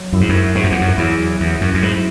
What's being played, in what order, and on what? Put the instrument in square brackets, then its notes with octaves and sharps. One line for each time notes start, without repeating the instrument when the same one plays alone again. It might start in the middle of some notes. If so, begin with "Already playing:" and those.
Already playing: [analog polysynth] F#3
[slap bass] F#2 [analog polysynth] E4
[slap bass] G#2
F#2
[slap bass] G#2 [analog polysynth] F#3
[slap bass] F#2
E2
F#2
[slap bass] E2 [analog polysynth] E4
[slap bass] E2 [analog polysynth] F#3
[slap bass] F#2
F#2
[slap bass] G#2 [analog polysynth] E4